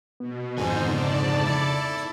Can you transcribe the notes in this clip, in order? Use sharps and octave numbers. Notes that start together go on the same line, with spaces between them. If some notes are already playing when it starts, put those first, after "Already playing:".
B2 B3
F2 G#2 D3 D#3 D#4 C5 G#5
C#3 B3 D#4 D5 A5
E4 A4